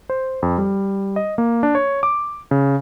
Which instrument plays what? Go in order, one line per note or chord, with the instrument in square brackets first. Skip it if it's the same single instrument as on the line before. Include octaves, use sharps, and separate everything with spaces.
[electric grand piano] C5
F2
G3
D#5
A#3
D4
C#5
D6
C#3